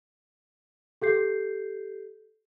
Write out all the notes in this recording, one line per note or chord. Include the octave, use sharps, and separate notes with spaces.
G4 A4 G6 C7